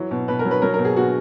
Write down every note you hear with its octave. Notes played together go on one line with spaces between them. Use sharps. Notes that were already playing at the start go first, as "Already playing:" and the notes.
Already playing: E3 F#3
B2
B2 B4
A#4
F#3
B4
F#3 A#4
B2 A#4
G#4
B2 F#4